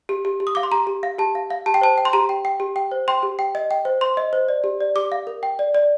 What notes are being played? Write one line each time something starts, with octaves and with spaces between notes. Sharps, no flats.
G4
G4
G4
D#6
F5 D6
C6
G4 A#5
G4
F5
G4 A5
F5
F5
G4 A5
G5
C5 A5
G5
C6
G4 A#5
G5
G5
G4
G5
C5
G5 C6
G4
G5
D#5
G5
C5
C5 C6
D#5
C5
D5
G4
D5
G4 D6
F5
A#4
G5
D5
D5